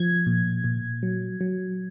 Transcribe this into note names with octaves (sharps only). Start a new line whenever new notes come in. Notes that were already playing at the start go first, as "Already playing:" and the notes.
Already playing: F3 G#6
A#2
A#2
F#3
F#3